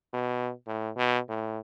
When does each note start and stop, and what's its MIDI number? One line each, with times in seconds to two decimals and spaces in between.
0.14 0.52 47
0.67 0.90 45
0.96 1.19 47
1.29 1.59 45